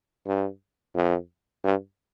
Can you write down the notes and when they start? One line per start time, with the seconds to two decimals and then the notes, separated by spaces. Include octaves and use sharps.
0.27 G2
0.95 F2
1.64 G2